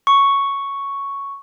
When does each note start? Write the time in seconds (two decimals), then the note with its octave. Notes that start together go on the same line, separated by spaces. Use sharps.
0.07 C#6